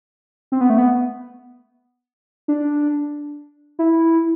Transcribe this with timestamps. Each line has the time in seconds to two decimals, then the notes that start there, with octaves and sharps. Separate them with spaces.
0.52 C4
0.61 B3
0.70 A3
0.78 B3
2.48 D4
3.79 E4